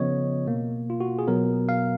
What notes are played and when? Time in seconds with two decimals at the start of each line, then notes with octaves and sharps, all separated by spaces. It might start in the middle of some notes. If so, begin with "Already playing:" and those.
Already playing: C#3 F3 B3 C#5 D#5
0.47 B2 A#3
0.90 F4
1.00 F#4
1.19 G#4
1.27 B2 F#3 B3 A#4
1.69 F5